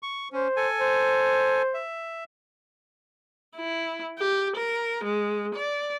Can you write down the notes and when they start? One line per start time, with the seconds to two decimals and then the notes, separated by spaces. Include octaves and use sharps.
0.03 C#6
0.32 C#4 C5
0.56 A4 G#5
0.80 C5
1.74 E5
3.56 E4
4.19 G4
4.56 A#4
5.04 G#3
5.55 D5